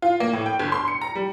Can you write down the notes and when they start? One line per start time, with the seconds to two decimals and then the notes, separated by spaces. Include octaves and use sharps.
0.02 F4
0.20 A#3
0.33 A2
0.46 G5
0.60 G1
0.72 C6
0.88 C#7
1.02 A#5
1.15 G3